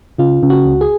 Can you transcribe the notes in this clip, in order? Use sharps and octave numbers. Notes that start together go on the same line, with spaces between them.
C#3 F4
C#3
F#4
C#2
G#4